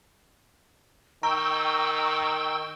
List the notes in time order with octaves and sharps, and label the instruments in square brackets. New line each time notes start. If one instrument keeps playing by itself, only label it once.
[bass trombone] D#3 [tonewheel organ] G5 E6 [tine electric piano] A#5 [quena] C#6